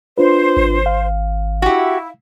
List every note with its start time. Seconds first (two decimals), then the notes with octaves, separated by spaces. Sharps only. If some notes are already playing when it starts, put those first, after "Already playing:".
0.18 D4 F4 B4 C5
0.57 G#1
0.86 F5
1.62 E4 F#4 G4